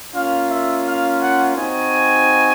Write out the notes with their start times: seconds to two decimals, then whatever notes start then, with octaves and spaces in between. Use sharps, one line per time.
0.13 A#3 C#4 F4 F5
0.49 E5
0.85 F5
1.20 F#5
1.56 C4 D#4 F#4 G#5